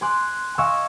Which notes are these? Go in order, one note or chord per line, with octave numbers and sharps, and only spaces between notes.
G#5 C6 D6 F#6
D#5 F5 G#5 C#6 D6 E6